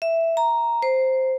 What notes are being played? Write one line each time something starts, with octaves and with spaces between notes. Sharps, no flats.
E5
A#5
C5